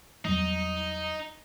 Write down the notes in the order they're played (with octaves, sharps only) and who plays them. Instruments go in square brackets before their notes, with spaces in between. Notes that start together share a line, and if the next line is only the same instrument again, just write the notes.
[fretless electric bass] E2 F#3 G3 [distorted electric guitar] D#4